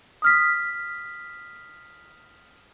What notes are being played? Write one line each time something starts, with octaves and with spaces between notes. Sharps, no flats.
D#6 F6 B6